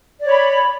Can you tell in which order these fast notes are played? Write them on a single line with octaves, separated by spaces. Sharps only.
D5 C#5 B5